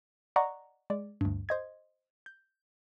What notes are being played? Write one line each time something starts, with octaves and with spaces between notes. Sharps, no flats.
D5 D#5 F#5 A#5 C#6
G#3 D5
D2 G2
C5 D#5 G#6
G6